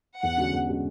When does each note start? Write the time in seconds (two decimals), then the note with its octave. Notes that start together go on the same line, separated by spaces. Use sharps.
0.22 E2 F#5
0.38 D3 G#3 C#4 F#4
0.53 E2
0.68 D3 G#3 C#4 F#4